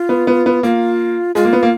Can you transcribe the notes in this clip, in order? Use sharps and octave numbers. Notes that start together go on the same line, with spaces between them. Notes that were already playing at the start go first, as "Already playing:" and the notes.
Already playing: F4
B3
B3
B3
A#3 F4
G#3 F4
A#3
B3
A#3